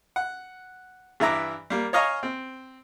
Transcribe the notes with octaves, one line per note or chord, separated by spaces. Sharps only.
F#5
G2 E3 E5 A#5 D6
G3 A#3
C#5 D#5 F5 G#5 A#5 C#6
C4